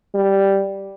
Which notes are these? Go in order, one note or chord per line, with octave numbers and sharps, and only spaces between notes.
G3